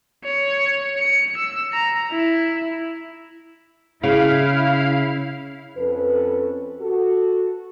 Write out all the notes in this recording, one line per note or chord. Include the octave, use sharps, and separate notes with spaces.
C#5
C#7
E6
A#5
E4
C#3 E4 F5
F2 C#4 A4 B4
F#4 A4